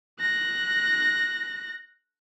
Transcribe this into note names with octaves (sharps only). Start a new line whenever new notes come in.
F#6 A#6